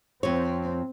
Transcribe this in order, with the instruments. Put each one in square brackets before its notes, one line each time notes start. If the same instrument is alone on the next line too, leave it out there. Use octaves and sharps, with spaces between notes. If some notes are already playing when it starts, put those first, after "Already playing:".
[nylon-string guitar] F2 C#5 [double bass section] C4